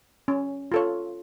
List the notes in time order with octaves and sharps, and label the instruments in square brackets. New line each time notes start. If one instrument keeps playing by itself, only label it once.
[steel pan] C#4
F4 A4 C#5